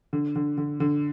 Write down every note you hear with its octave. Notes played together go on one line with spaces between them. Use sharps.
D3
D3
D3
D3